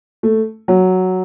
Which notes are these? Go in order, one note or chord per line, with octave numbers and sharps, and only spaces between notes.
A3
F#3